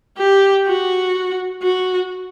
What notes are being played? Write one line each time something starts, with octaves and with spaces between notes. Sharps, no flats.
G4
F#4
F#4